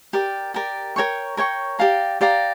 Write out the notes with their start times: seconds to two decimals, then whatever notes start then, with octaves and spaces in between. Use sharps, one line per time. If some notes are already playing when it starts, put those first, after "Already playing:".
0.13 G4 A#4 D5
0.54 G4 A#4 D5
0.96 A#4 C#5 G5 C#6
1.37 A#4 C#5 G5 C#6
1.79 G4 D5 F5 A#5
2.21 G4 D5 F5 A#5